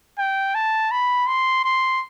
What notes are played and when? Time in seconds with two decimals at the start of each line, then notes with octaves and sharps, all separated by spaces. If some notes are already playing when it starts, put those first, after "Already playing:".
0.19 G5
0.55 A5
0.91 B5
1.27 C6
1.64 C6